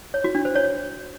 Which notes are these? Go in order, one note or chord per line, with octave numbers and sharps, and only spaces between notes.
C#5
F#4
D4
C5
C#5